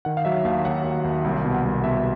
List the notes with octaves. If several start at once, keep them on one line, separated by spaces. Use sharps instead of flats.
D#3 F#5
F5
F#3 E5
D#2 F5
D#2 F#5
D#2
D#2
C2
B2
F#5
C2
B2 E5